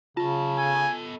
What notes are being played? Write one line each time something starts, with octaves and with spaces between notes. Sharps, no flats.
C#3 F#3 F4 A5
B3 A4 G#5